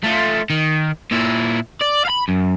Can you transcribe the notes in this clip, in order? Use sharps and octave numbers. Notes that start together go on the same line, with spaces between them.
A3 F4
D#3
A#2 E4
D5
F5 B5
F#2